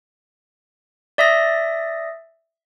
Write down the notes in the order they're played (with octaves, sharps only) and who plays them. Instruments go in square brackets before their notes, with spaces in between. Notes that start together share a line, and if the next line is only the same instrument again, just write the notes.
[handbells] D5 E5 D#6 A#6